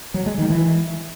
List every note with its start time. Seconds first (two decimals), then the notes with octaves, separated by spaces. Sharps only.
0.14 F#3
0.26 G#3
0.38 D#3
0.50 E3